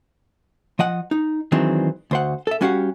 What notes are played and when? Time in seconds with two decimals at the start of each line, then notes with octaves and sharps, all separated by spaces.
0.79 F3 D#5 F#5
1.11 D#4
1.52 D#3 E3 F#3 G#3 C4 D4
2.11 D2 C5 F#5
2.47 A4 E5
2.61 G3 C#4 F#4 G4 F5 F#5